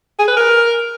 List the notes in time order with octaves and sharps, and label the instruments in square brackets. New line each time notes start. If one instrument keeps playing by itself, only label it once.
[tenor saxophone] G#4
B4
A#4